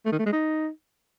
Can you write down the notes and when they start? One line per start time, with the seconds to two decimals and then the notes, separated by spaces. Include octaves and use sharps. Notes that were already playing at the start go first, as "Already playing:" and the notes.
0.06 A3
0.12 D#3
0.19 A3
0.26 G#3
0.33 D#4